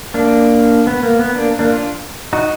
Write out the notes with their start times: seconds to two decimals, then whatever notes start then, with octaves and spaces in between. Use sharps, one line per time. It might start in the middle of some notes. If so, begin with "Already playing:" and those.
0.14 A#3 D4
0.87 B3
1.03 A#3
1.19 B3
1.35 A#3 D4
1.59 A#3 D4
1.72 D4 F4
2.33 D#4 F#4